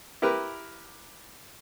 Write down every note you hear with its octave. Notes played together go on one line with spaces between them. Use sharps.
E4 G4 A#4 B4